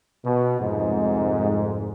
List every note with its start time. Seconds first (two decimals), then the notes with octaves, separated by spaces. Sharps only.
0.24 B2
0.60 C2 F2 G#2